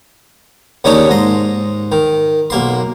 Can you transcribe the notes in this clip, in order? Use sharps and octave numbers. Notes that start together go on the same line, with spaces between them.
D#2 C#3 D4 D#4 C#5 D#6
G#2 D#5 C6
D#3
B1 A#3 C6